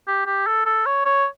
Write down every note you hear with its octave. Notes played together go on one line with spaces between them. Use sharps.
G4
G4
A4
A4
C#5
C#5